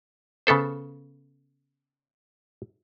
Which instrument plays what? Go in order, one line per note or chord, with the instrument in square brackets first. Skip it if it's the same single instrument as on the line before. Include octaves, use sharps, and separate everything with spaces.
[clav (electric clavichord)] C#3 B3 A4 C5